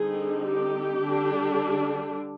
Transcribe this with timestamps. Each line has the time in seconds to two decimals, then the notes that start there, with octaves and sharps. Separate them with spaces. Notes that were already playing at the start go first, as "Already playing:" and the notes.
Already playing: D3 G3 C4 D#4 G#4
0.43 G4
1.01 D3 G3 D4